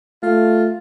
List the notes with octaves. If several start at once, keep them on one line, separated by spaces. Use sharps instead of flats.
A3 F4